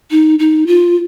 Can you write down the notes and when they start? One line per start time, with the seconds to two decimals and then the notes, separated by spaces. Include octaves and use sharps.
0.11 D#4
0.39 D#4
0.67 F4